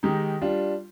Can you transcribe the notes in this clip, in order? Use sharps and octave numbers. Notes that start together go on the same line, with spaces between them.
D#3 G#3 D#4 G4
G3 D4 F4